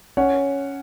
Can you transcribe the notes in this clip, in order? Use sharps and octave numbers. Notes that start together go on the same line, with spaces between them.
C#4 C#5 F#5